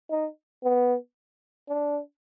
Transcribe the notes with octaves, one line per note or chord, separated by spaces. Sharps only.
D#4
B3
D4